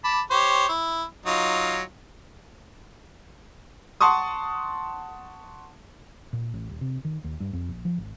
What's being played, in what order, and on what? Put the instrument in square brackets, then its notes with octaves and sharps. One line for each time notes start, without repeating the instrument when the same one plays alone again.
[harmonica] A5 B5 D6
G4 C5 C#5
E4
F#3 D#4 F4
[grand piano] F#5 A5 C6 C#6 D#6
[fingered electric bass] A#2
A1
D#1
C3
D#3
D#2
G2
F2
A#1
F3
G#1